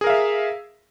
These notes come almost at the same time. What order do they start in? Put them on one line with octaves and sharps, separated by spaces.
G#4 A#4 F5 E5